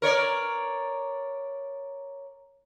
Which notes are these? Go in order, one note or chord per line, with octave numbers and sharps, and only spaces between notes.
A#4 C#5 D5